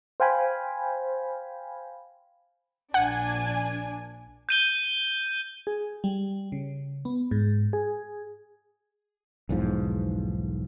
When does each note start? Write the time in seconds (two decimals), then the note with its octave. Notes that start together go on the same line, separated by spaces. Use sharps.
0.20 C5 F5 G5 G#5 B5
2.94 A#1 D4 F#5 G#5
4.49 G6 D#7 G7
5.67 G#4
6.04 G3
6.52 C#3
7.05 B3
7.31 G#2
7.73 G#4
9.49 B1 E2 G#2 F3